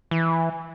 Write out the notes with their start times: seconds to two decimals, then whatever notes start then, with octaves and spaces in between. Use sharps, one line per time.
0.11 E3